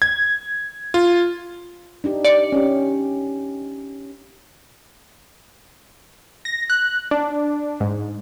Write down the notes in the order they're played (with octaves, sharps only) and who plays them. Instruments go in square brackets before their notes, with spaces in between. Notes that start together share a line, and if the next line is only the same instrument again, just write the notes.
[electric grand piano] G#6
F4
[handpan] D4 D#4 G4
[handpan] D4 [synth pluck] D5 C#7
[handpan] C#4 G4
[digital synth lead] A#6
F#6
D4
G#2